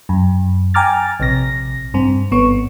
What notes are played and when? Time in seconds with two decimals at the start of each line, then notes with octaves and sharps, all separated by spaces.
0.09 F#2
0.74 G5 G#5 A#5 D6 F6 A6
1.20 A#1 C3 A#6
1.94 G2 C4
2.31 G#1 B3 C#6